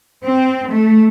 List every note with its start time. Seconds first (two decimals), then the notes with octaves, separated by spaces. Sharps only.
0.24 C4
0.71 A3